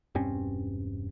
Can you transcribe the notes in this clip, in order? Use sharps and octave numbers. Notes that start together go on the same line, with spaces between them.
E1 G2 C4 C#4